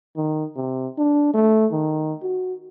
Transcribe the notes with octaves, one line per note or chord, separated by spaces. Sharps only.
D#3
C3
D4
A3
D#3
F#4